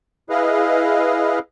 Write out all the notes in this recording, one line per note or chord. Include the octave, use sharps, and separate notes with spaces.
E4 G#4 B4 D#5 F5